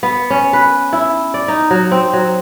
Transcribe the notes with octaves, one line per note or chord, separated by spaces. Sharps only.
B3
C#4
B4
E4
D5
D#4
F#3
C4
F#3